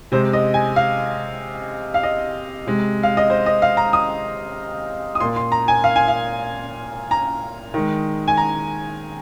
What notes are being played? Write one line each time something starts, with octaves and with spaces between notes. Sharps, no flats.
C3 G#3 C5
D#5
G#5
F5
F5
D#5
C3 G#3
F5
D#5
C5
D#5
F5
A#5
D#6
D#6
A#2 A#3 C6
C6
A#5
G#5
F5
G#5
F5
A#5
D#3 G#3
G#5
A#5